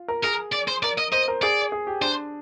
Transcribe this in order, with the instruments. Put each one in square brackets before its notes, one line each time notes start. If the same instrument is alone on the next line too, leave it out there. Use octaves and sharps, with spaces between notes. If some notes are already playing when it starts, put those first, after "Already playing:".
Already playing: [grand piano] F4
A#4
[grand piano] G#4 [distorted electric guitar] A#4
[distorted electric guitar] D5
C5
[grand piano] A#4 [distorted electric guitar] D5
[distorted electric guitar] D#5
[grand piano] C5 [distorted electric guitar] D#5
[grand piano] A#4
[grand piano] G#4 [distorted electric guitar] D5
[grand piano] G#4
G4
[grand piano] D4 [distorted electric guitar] C5